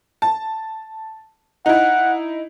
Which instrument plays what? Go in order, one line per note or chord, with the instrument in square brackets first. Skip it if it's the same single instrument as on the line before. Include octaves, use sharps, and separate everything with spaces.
[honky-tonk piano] A5
[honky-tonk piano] D#4 E4 [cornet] F#5